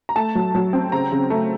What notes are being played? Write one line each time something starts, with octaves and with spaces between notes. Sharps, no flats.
A#5
A3 A5
F#3
F#3
C4
C#3 A#5
C#3
A3